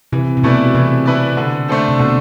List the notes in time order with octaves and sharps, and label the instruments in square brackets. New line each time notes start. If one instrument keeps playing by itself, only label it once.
[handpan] C3 [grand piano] E3
[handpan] C3
[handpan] B2 [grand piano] A3 E4 B4 D5
[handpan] C3 [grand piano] E3
[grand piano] A3 E4 B4 D5
D3
A3 D4 A4 C5
[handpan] C3
[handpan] B2 [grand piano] D3